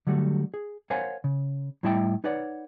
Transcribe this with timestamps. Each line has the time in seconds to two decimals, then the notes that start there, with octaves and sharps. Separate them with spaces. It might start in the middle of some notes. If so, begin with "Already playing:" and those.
0.07 D3 F#3 G3 A3 F#4
0.54 G#4
0.90 A#4 C5 C#5 F5 F#5 G#5
1.24 C#3
1.83 A2 G3 E4 D#5 E5 G5
2.24 D#4 B4 C#5 D5 F#5